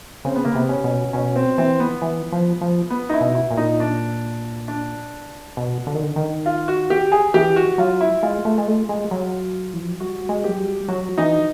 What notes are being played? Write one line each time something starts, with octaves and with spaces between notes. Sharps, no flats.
C#3 C4
B3
A#3
C3 B3
C#4
B2
B2 C#4
C4
E3 C4
B3
E3
F3
F3
B3
D#4
E4
B2
E4
A#2
D#4
D4
D4
B2
D3
D#3
D3
D#3
F4
F#4
G4
G#4
E3 G4
F#4
F#3 F4
E4
G#3 F4
A3
G#3
A3
G#3
F#3
E3
F3
F#3
G3 F#4
G#3
F#3 G4
G3
F#3 F#4
E3 D#4